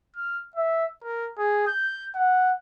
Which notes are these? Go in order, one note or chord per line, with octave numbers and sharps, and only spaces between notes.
F6
E5
A#4
G#4
G6
F#5